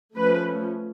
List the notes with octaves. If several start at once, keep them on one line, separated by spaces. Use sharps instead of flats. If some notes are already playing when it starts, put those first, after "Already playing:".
F3 A3 C#4 B4